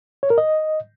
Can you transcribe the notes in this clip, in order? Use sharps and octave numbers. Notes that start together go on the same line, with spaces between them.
C#5
A#4
D#5